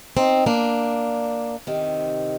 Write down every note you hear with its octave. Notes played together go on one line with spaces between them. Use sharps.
C4 D#4
A#3 D4
C3 D#3